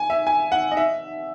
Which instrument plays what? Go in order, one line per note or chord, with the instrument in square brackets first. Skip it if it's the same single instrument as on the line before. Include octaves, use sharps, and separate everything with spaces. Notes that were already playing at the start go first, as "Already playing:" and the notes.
Already playing: [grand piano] G#5
E5
G#5
F#5
D#5
E5